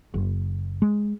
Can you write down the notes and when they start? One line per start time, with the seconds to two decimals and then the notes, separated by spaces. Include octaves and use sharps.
0.14 F#1
0.82 G#3